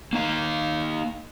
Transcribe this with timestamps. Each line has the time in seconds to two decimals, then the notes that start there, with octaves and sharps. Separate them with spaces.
0.13 A#3 D#4 F5